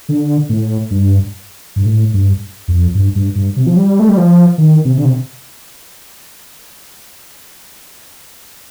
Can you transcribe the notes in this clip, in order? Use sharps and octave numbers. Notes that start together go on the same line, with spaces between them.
D3
A2
G2
G2
A2
G2
F2
G2
G2
G2
C3
F3
G3
A3
G3
F3
D#3
C3
D3
C3